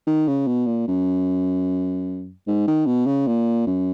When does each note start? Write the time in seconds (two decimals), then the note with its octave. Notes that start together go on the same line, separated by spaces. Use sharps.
0.07 D#3
0.28 C#3
0.47 B2
0.66 A#2
0.88 F#2
2.48 G#2
2.67 D#3
2.86 B2
3.07 C#3
3.27 A#2
3.67 F#2